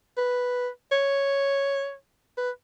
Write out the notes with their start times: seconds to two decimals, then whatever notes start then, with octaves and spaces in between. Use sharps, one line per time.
0.17 B4
0.91 C#5
2.37 B4